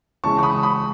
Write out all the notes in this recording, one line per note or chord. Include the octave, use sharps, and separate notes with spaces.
C#3 E3 G#3 A5 C#6
C#6
B5 D#6
B5 D#6